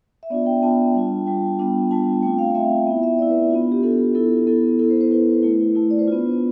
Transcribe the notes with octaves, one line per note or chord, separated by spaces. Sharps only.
E5
B3 D4 F4 D5
G5
B3 D4 F4 A5
G3 D4 F4
G3 D4 F4 G5
G3 B3 D4 F4
G3 B3 D4 F4 A5
A3 C4 F4 G5
F5
F5
A3 C4 F4 E5
B3 E4 E5
E5
B3 E4 D5
B4
B3 D4 F4
G4
B3 D4 F4 A4
B3 E4 A4
B3 E4 A4
B3 E4 A4
C5
C5
B3 E4 B4
A3 E4
A3 E4
D5
C5
B3 D4 F4 B4